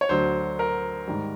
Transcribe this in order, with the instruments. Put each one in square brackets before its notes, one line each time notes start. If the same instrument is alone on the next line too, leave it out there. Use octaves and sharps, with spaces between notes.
[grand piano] C#5
D2 D3 F#3 C5
A#4
G#2 D#3 G3